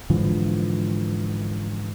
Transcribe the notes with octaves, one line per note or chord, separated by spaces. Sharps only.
G#2 D3 E3 F3